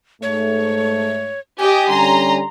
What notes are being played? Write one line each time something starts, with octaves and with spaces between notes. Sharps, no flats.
G#2 A3 C#5
G4 D#5 G5 G#5
D3 G3 C#4 A#5 C6